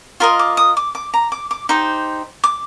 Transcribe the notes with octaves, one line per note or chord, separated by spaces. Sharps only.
F4 A#4 D#5 C6
D6
D#6
D6
D6
A#5
D6
D6
D#4 G4 C5
D6